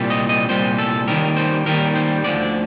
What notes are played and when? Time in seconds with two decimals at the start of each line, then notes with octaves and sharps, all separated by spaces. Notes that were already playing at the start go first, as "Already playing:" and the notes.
Already playing: C2 A#2 G3
0.10 D#5
0.29 D#5
0.49 C2 A#2 G3 C5
0.79 A4
1.08 D#2 D#3 G3 A#4
1.37 C5
1.66 D#2 D#3 G3 A#4
1.95 C5
2.24 D2 D3 F3 D5